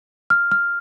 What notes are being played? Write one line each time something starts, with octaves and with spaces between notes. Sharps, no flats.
F6
F6